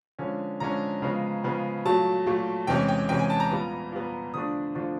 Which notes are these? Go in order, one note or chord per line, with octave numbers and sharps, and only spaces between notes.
D3 F3 G#3 C#4
D3 F3 G#3 C#4 A#5
C#3 F3 G#3 B3
C#3 F3 G#3 B3
A#2 F#3 A3 A5
A#2 F#3 A3
E2 C3 E3 G#3 C#4 G5
G5
E2 C3 E3 G#3 C#4 G5
G#5
A5
A#5
A#2 G3 B3
A#2 G3 B3
D3 F3 A3 D4 D#6
D3 F3 A3 D4